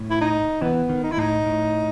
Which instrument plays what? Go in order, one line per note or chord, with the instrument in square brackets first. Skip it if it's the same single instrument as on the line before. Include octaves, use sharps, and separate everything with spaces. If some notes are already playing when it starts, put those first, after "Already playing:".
Already playing: [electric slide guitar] A2
[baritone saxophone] E4
D#4
[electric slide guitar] E3 [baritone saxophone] B3
[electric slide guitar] D#3
[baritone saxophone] D#4
E4
[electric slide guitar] A2 [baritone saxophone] D#4
[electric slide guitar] A2